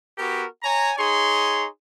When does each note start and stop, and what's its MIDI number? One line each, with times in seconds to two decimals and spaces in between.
0.18 0.45 59
0.18 0.45 66
0.18 0.45 67
0.18 0.45 70
0.62 0.92 73
0.62 0.92 80
0.62 0.92 82
0.98 1.67 63
0.98 1.67 68
0.98 1.67 73
0.98 1.67 84